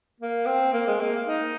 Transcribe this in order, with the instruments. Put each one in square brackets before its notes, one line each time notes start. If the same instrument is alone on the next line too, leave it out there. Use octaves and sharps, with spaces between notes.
[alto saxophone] A#3
C4
A#3
G#3
A#3
D#4